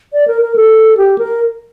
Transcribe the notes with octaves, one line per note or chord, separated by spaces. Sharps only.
D5
A#4
A#4
A4
G4
A#4